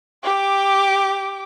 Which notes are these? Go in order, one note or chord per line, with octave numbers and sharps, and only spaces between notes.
G4 D6